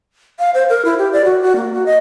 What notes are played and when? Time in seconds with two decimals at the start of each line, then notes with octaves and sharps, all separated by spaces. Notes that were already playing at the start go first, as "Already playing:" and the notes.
0.39 F5
0.54 C5
0.70 A#4
0.85 E4
0.98 G4
1.13 D5
1.25 F#4
1.42 F#4
1.56 A#3
1.74 F#4
1.86 D#5